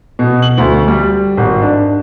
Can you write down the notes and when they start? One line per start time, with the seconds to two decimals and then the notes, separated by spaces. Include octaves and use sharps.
0.19 B2
0.42 F#7
0.58 D2
0.88 G3
1.37 G#1
1.62 D4